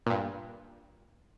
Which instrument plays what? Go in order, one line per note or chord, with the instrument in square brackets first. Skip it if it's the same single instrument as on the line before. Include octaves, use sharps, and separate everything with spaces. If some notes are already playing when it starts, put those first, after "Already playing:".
[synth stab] G2 A#2